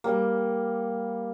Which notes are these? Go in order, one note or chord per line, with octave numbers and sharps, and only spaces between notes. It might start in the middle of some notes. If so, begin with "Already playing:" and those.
G3 A#3